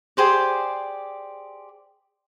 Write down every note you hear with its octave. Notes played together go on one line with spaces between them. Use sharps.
G4 G#4 C5 D5